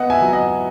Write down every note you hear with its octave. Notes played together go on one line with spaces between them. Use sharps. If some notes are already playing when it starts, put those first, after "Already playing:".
Already playing: B3 D#5 F#5
E5 G#5
F#3
D#5 F#5